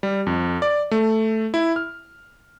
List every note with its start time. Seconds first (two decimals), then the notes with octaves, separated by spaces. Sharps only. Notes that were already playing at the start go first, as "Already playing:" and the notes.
0.03 G3
0.27 F2
0.62 D5
0.91 A3
1.54 E4
1.76 F6